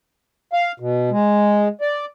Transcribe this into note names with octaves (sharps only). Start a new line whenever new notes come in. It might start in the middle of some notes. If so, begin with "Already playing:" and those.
F5
B2
G#3
D5